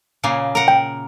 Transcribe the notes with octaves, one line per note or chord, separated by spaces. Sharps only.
A#2 C#3 A#3
A#4 F#5
G5